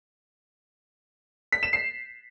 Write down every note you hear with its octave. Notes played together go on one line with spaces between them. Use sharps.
B6
E7
C7